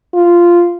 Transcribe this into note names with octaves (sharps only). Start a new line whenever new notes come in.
F4